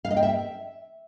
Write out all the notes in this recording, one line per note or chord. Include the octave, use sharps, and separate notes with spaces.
F5
D#5
G5
E5